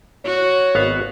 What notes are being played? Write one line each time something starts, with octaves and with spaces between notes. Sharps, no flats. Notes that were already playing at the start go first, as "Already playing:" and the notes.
F#4 C#5
G#1 B3 F5